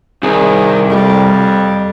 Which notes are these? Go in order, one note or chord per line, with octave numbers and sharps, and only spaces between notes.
C2 D#3 G#4
F2 G3